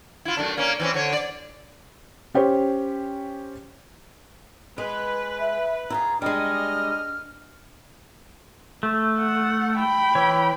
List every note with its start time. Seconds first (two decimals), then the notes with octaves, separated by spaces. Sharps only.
0.25 E4 F4
0.37 F#2 A3 D4
0.57 A#3 C#4
0.80 E3 C4 C#4
0.94 D3 C#5
1.13 D5
2.34 C#4 G4 C5 C#5
4.78 G#3 B4
5.40 E5
5.90 E4 F4 G#4 A#5
6.22 G3 G#3 D4 D#5 F6
8.83 A3
9.18 F#5
9.78 G5 B5
10.15 E3 C#5